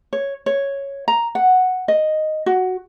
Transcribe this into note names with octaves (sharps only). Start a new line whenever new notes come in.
C#5
C#5
A#5
F#5
D#5
F#4